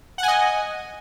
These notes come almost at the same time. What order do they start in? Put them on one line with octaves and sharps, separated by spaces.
F#5 G#5 D#5